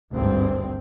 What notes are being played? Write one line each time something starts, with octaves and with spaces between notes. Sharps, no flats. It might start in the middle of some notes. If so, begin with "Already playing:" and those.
G#1 D2 G2 C4